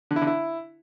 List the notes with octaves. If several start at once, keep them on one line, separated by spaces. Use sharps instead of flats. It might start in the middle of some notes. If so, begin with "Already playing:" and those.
D3
E4
D3
E4